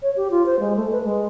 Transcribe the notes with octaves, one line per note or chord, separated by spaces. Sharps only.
C#5
G4
F4
C5
G#3
A3
B4
G#3